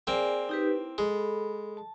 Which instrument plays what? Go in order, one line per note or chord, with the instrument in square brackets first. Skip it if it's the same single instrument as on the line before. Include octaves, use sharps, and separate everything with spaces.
[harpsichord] A#3 C4 [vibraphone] G#4 D5 G#5
[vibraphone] D#4 G4 B4
E4
[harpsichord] G#3 [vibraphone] A4 B5
[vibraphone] A5